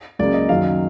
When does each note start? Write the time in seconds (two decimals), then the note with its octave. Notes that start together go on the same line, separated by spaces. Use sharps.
0.19 C#2 C#3 F#3 A#3 D5
0.34 D#5
0.49 F#2 D#3 F#3 F5